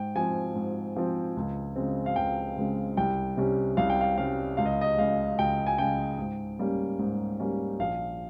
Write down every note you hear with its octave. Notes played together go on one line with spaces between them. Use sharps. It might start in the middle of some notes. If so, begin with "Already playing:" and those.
Already playing: G#2 G5
F3 C4 G#5
G#2
F3 C4
C#2
C#3 G#3 C4
F5
C#2 G5
C#3 G#3 C4
C2 G5
C3 G3 C#4
C2 F5
G5
F5
C3 G3 C#4 F5
C#2 F5
D#5
D#5
C#3 G#3 F5
C#2 G5
G#5
C#3 G#3 G5
G#2
G3 A#3 C#4
G#2
G3 A#3 C#4
A#1 F5